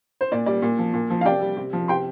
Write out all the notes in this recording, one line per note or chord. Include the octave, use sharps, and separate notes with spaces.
C5
A#2 D5
G3 D5
A#2
F3
A#2
F3
F5
C3 D5 G5
G3
C3
F3
C3 G5 C6